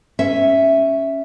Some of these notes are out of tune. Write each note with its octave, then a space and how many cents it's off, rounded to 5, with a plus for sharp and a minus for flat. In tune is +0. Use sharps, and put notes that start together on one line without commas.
C#4 +0 E5 +0